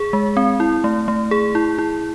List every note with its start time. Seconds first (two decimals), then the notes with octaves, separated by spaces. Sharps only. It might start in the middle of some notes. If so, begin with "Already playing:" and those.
Already playing: G#4
0.13 G#3
0.37 C4
0.60 E4
0.84 A3
1.08 A3
1.31 G#4
1.55 E4
1.79 E4